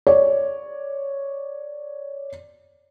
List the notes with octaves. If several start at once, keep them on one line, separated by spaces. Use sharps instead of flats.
C#5 D5